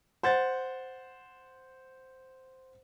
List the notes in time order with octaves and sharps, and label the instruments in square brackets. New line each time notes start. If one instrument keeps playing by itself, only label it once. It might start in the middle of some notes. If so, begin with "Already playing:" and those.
[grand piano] C5 F#5 A6